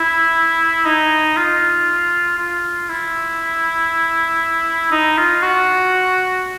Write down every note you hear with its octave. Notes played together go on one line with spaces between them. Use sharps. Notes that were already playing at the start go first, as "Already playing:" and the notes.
Already playing: E4
D#4
F4
F4
E4
D#4
F4
F#4